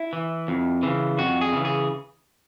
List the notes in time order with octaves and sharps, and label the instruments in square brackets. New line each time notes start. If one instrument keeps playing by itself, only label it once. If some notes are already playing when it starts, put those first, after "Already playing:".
Already playing: [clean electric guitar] E4
E3
F2
C#3 E3
F2 F#4
G#4
C#3 E3
G#4